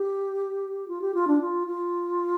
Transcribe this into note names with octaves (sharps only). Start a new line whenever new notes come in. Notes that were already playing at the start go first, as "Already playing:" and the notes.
Already playing: G4
F4
G4
F4
D4
F4
F4